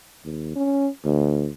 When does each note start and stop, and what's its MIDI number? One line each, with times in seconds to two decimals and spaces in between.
0.25 0.51 39
0.56 0.88 61
1.05 1.51 38